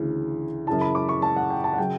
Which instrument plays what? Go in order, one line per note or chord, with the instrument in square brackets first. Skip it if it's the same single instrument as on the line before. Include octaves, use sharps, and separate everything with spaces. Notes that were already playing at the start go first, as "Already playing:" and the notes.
Already playing: [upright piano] D2 C#3 E3
F#2 C#3 E3 A5
B5
D6
C#6
A5
F#5
G5
A5
F#5
C#3 F#3 G5